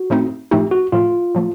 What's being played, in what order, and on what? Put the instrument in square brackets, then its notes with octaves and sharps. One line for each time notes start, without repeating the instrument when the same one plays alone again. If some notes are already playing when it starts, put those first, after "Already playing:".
Already playing: [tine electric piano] F#4
[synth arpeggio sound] A2 F3 A3 C4 D#4
[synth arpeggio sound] A2 F3 A3 C4 D#4 [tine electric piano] G4
[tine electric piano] F#4
[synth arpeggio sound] A2 F3 A3 [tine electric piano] F4
[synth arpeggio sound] A2 F3 A3